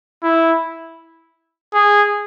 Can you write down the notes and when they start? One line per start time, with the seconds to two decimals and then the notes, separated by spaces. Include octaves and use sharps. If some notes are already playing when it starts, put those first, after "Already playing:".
0.23 E4
1.74 G#4